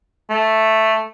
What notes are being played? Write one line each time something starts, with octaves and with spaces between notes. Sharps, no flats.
A3